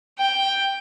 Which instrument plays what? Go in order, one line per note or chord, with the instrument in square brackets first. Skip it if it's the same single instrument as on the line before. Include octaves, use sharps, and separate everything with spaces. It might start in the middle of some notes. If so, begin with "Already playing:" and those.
[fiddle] G5